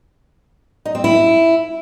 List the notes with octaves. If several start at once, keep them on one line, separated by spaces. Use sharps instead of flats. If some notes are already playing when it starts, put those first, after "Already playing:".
D#4
C4
E4